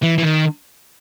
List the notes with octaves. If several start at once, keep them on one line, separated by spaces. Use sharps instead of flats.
E3
E3
D#3